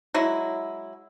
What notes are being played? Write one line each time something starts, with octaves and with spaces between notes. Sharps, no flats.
F#3 G#3 E4